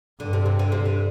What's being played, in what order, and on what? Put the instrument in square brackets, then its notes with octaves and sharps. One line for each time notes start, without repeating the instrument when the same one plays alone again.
[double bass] G2 [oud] D3
[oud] C3
C3
D3
C3
D3